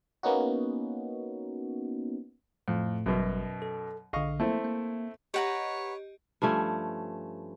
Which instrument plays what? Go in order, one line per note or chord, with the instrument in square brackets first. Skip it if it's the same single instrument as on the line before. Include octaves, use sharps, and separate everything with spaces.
[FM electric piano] A#3 B3 C#4 D#4 F#4
[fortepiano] F2 [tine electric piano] A2 A3
[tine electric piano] G#1 G3 [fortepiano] F#2 B2
[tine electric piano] A4
[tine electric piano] A#1 D3 [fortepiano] D#5 F5 C#6
[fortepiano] A3 C4 E4 [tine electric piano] A#3
[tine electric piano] A#3
[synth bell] G4 D#5 [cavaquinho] B4 F#5 A#5 [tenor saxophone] C#5
[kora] G2 F3 A3 C#4